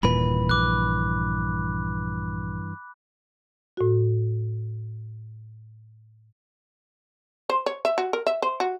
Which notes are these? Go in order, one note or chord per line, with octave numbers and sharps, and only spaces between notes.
D#1 G2 A#2 E3 B4 B5
A#1 D6 F#6
A2 F#4
C5
C#5
E5
F#4
A#4
E5
C5
F#4